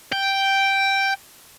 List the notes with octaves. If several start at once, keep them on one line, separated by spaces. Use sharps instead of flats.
G5